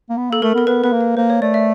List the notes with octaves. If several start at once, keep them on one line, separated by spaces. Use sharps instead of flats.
A#3
B3
A#3 A4
A3 A#4
B3 A#4
B3 B4
B3 B4
A#3
B4
A#3 C5
C#5
A3 D5
E5